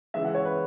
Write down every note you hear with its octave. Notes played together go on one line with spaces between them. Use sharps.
C#3 E3 G#3 E5
F#5
C#5
B4